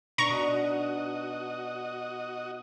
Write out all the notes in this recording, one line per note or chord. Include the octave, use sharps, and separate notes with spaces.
B2 D4 D#4 A#5 C#6
B2 F#4 D#5